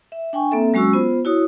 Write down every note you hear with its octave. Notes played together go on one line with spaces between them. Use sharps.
E5
D4 G5 G#5 C#6
A#3 C4 A4 E5
F#3 G#3 C#4 F#4 C#6 E6
B3 F4 C5
E4 F#4 C#5 D#6